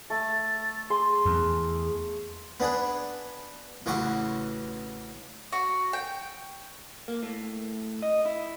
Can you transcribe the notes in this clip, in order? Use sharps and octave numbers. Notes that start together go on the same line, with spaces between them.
A3 A6
G#4 C6
E2
B3 D4 G#4 B4
A1 C#3 E3 F#4 D6
F#4
G5
A#3
A2
D#5
E4